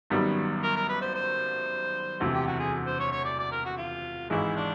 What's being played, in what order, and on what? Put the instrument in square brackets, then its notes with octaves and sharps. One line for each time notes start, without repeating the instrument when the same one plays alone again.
[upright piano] G#1 F#2 D#3 G3 B3
[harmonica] A#4
A#4
B4
C5
C5
[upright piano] E1 D2 C3 E3
[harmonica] G4
F#4
G#4
C5
C#5
C#5
D5
D5
A#4
F#4
F4
[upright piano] G#1 G#2 E3 G#3 [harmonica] E4
[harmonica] D4